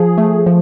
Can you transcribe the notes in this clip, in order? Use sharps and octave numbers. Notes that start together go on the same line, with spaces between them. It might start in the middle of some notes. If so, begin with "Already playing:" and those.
Already playing: F3 G#4
A3
F3